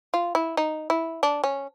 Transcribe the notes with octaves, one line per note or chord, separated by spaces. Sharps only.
F4
E4
D#4
E4
D4
C#4